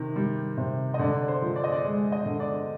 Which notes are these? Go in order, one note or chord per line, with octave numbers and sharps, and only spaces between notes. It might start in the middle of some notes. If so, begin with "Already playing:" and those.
Already playing: C3 D#3
G3
C3
D#5
D3 D5
D5
C5
F3
D5
D#5
D5
G#3
D#5
D3
D5